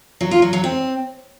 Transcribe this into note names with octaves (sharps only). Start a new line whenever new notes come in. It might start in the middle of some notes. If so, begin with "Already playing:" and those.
F#3
F4
F#3
F#3
C4